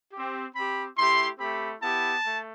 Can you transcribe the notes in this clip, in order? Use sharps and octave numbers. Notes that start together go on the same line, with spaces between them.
G4
C4
C4 G4 B5
A3 E4 G4 C6
A3 C4 G4 B5
B3 E4 G4 A5
A3